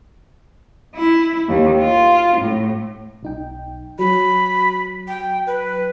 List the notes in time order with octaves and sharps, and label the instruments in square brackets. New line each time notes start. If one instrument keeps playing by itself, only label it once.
[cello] E4
D#2
F4
A2
[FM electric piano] B1 D#4 G5
[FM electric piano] F#3 [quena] B5
[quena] G5
B4